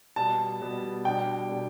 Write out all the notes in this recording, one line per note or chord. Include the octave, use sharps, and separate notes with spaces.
B2 G3 B3 A5
B2 G3 B3
B2 G3 D4 G5
B2 G3 D4